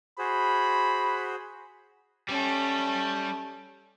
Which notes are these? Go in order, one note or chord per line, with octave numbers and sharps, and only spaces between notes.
F#4 G#4 C5 B5
G3 A3 C#4